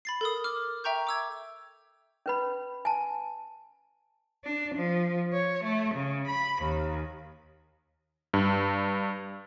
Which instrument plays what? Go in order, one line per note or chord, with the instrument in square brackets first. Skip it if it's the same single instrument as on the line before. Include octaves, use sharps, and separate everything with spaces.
[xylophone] B5 A6 C7
A4 A#4 D#6
D6 F6
E5 G5 A#5 C#6 G6
D6 E6 G#6
[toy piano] C#4 B4 B5
G#5 A5
[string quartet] D4
F3
C#5
A3
C#3
B5
D#2
[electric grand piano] G2